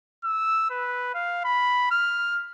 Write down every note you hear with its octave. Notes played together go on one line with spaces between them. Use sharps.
E6
B4
F5
B5
F6